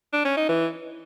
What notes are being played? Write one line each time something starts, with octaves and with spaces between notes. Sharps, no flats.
D4
C#4
D#4
E3